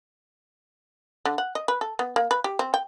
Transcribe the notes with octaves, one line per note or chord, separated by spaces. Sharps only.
D3
F#5
D#5
B4
A4
B3
A#3
B4
G4
C4
G5